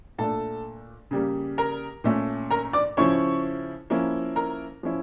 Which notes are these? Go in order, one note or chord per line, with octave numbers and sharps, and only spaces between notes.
A#2 A3 D4 A4 A5
C#3 G3 A#3
A#4 A#5
A#2 A3 C#4
A#4 A#5
D5 D6
C#3 F3 C#4 E4 C#5 C#6
F3 A#3 C#4 E4
A#4 A#5
F3 C#4 E4